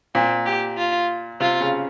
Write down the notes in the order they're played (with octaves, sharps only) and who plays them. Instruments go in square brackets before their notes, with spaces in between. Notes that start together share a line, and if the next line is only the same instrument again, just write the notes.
[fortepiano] A#2 [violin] C4
[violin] G4
F4
[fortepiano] C3 [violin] F4
[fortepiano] C#3